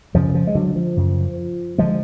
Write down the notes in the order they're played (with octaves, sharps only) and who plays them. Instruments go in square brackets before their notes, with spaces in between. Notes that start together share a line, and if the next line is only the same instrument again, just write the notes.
[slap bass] F#2 C#3 F3
F3
G#3
D3 F#3
F3
F#2 C#3
D3 F3 G#3